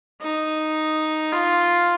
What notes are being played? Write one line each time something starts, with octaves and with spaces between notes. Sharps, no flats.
D#4
F4